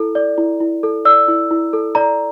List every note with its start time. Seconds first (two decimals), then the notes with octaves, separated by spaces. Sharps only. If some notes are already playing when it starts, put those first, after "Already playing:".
Already playing: E4 A4
0.15 D5
0.38 E4
0.60 E4
0.83 A4
1.05 D5 E6
1.28 E4
1.51 E4
1.73 A4
1.95 D5 A#5